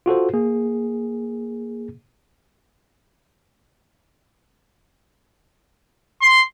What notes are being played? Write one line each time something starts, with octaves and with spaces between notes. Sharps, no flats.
F4 F#4 A4 C5
A#3 G#4
C6